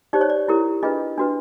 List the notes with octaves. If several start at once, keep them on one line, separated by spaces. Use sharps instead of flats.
D#4 G4 C5 D5
C#5
D5
E4 G4 A#4
D4 F4 G#4 B4 D#5
D4 F#4 B4